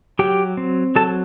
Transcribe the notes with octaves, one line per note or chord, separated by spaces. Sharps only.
F#3 G4 G5
C4
F#3 A4 A5